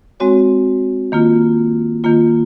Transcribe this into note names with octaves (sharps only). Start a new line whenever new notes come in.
G#3 C4 F#4 C#5
D#3 A#3 F4
D#3 A#3 F4